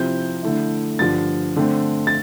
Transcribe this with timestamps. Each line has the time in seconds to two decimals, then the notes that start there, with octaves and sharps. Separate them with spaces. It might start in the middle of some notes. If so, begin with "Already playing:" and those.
Already playing: C3 F3 C4 E4 G6
0.43 D3 A3 E4
0.99 G2 D3 F3 A6
1.56 D3 A3 C4
2.07 A6